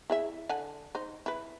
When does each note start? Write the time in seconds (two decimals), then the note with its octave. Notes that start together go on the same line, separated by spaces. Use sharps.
0.10 E4 G#4 E5
0.49 D3 F#5 G#5
0.95 D#4 C5
1.26 E4 B4